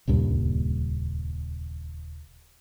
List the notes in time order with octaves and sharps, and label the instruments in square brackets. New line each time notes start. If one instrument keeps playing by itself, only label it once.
[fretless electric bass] D#1 C#2 G2 A#2